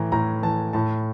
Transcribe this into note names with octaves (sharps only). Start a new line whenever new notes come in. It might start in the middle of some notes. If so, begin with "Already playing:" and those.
Already playing: A2 E3 A#5
A2 A#5
E3 A5
A2 A5